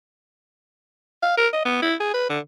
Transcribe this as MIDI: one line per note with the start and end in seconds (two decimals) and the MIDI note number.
1.23 1.35 77
1.37 1.48 70
1.53 1.65 75
1.65 1.78 59
1.82 1.95 64
2.00 2.11 68
2.14 2.29 71
2.29 2.39 50